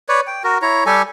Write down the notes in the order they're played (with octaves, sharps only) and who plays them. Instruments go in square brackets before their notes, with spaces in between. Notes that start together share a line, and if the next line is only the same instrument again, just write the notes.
[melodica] B4 C#5 D5
G5
F#4 A#4
E4 C#5 A#5
G3 G4 A4 G#5